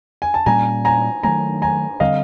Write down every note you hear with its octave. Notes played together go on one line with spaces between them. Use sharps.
G#5
A5
A#2 G3 A#3 C#4 G#5 A#5
G#5 A#5
D#3 F#3 A3 G#5 A#5
G#5 A#5
D3 G3 C4 D#5 F5